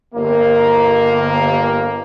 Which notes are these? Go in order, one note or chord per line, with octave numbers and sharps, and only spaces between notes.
G1 A#3